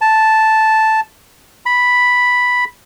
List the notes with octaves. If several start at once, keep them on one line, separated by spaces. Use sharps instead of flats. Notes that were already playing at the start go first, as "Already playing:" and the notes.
A5
B5